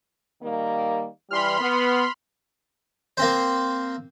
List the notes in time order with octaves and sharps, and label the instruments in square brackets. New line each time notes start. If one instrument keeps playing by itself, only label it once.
[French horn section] D#3 G3 A#3
[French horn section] E3 G3 [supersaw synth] B5 C6 F6
[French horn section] B3
[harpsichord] A#3 C4 C5